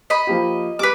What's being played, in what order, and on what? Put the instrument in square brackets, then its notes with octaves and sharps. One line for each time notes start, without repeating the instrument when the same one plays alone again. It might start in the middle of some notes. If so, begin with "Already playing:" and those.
[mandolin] D#5 B5
[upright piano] F3 A#3 G4
[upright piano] G3 [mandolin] B4 D6